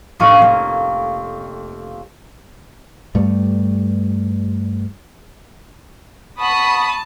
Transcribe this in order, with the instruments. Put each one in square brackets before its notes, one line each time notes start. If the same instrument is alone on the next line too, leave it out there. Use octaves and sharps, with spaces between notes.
[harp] F1 F2 A2 F5 C#6 D#7
F2 A#3 C#4
[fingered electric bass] G2 G3 A3
[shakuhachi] F#5 [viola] A5 [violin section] B5 D#6 [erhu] C#6